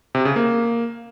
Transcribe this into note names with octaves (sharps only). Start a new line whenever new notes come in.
C3
C#3
A#3